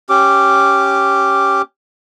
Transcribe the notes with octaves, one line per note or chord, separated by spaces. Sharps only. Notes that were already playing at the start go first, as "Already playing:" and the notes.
C#4 G4 D6